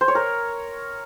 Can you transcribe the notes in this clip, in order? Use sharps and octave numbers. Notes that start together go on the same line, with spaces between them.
C5
C#5
A#4